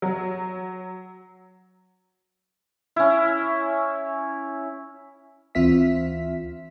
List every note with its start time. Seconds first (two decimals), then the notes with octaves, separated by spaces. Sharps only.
0.02 F#3
2.96 C#4 E4
5.55 D2 E3 C4 F4 E5 B6